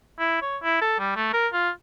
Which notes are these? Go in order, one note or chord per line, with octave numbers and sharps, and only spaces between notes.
E4
C#5
E4
A4
G3
A3
A#4
F4